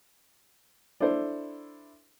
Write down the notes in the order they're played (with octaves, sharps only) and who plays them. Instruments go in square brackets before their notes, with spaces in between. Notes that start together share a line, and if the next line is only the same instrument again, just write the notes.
[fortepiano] D4 E4 A4 C5